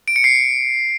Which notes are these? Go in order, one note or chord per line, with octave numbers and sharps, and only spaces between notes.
D7
C#7
C7